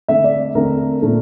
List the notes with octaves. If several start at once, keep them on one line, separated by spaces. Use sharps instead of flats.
D3 A3 C4 E5
D5
D3 A3 C4 A#4
A#2 A3 D4